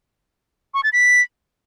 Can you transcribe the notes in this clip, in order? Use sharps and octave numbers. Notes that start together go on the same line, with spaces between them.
C#6
A6
B6